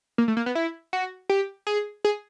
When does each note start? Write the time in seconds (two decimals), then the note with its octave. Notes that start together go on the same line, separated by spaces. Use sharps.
0.18 A#3
0.28 A3
0.37 A#3
0.46 B3
0.55 E4
0.93 F#4
1.29 G4
1.67 G#4
2.04 G#4